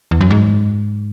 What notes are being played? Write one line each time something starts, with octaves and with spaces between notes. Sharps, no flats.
E2
F#2
G#2